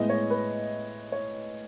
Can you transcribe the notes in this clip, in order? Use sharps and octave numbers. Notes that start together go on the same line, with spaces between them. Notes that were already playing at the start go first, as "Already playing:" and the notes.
Already playing: A2 G#3 B3 D#5
C#5
B4
C#5